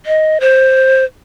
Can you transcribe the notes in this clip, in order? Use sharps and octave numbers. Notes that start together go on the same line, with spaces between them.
D#5
C5